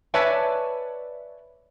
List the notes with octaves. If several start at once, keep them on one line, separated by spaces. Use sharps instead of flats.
B4 C#5 D5 E5 G#5 A5